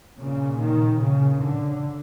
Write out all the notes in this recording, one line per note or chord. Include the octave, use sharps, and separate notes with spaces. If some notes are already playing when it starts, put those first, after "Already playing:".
A#2 C#3
D#3
C#3
D3